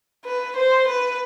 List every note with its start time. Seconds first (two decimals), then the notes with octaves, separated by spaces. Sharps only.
0.25 B4
0.56 C5
0.87 B4